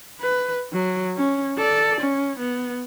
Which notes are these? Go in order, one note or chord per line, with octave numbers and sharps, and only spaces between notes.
B4
F#3
C#4
A4 D5
C#4
B3